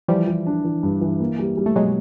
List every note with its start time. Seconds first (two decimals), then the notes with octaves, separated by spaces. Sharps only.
0.08 E3 F3 G3
0.27 E3
0.47 D4
0.64 E3
0.83 G2
1.01 E3
1.20 A#3
1.39 G3
1.57 G3
1.66 A3
1.76 B2 F#3 G#3